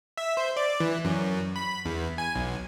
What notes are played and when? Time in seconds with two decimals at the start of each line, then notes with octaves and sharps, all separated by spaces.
0.17 E5
0.37 C5
0.57 D5
0.80 E3
1.05 F#2
1.56 B5
1.85 E2
2.18 G#5
2.35 B1